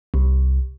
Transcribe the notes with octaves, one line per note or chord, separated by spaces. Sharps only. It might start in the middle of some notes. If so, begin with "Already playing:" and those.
C2